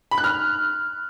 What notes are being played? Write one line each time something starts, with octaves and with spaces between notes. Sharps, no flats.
B5
F#6
F6